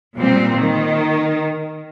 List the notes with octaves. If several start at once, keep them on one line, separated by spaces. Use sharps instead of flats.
A#2 G3 C4
D#3